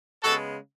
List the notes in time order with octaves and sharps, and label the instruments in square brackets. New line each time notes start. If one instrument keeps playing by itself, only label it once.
[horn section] C#3 G#3 B3 F#4 A4